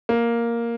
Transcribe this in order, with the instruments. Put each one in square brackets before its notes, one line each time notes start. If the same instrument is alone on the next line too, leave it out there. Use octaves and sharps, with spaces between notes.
[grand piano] A#3